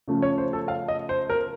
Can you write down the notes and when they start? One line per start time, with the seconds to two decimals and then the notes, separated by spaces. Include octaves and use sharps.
0.08 C#3 F3 A3 C#4
0.22 C#5
0.38 C5
0.53 A4
0.68 F5
0.88 D#5
1.09 C5
1.30 A#4